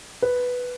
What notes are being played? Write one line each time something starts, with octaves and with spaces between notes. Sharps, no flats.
B4